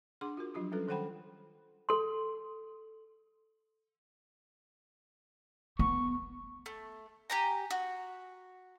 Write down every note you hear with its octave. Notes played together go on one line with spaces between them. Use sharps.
D4 G#4 F#5 C6 D6
F4 F#4 A#4
F3 F#3 D4 F4 G4
G3 C#4 F4 A4 B4
D#3 A4 C5 F#5 G5 B5
A4 C6
B3 C#6
A3
G4 G#5 A#5
F#4